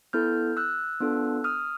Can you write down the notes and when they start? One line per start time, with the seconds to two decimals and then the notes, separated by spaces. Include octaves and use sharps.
0.13 B3 E4 A4 F6 G6
0.57 E6 F#6
1.00 B3 D4 F4 A4
1.44 D#6 F6